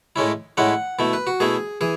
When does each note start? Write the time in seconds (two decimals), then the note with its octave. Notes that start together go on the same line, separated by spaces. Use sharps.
0.16 A2 G#3 C#4 E4
0.57 A2 G#3 C#4 E4 F#5
0.99 B2 A3 E4
1.13 B4
1.27 F#4
1.40 B2 A3 E4 G#4
1.81 E3 G#4